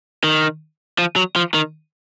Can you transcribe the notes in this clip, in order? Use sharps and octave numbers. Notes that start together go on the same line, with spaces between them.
D#3
F3
F#3
F3
D#3